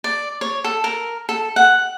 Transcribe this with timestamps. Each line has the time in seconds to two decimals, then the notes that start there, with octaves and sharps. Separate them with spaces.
0.04 D5
0.41 C#5
0.64 A4
0.84 A#4
1.29 A4
1.56 F#5